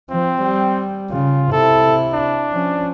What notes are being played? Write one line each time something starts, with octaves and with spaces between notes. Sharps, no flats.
F3 C4
G3
C#3 F4
C3 E4 A4
D4
F3 C#4